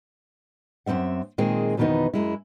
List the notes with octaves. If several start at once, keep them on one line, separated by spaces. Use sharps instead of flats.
F#2 D#3 C4 E5 F#5
A#2 D#3 G#3 C4 G#4
F2 B2 D#3 E3 B3 D#4
F#2 G#3 E4